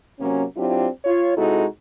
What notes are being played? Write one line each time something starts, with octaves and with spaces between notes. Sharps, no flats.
C3 F#3 A#3 C#4
F#3 C4 D4 E4 F4 G4
F4 C#5
C3 G#3 D#4 E4 F#4 A4